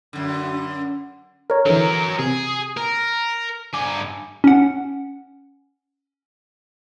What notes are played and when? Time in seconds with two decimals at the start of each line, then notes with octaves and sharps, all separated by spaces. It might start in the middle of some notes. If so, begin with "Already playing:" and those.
0.13 F#2 D3
1.50 A#4 C#5
1.66 D3 E3 F#3 A#4
2.19 C3 G#4
2.77 A#4
3.74 G2 G#5 D6
4.44 C#4 F#5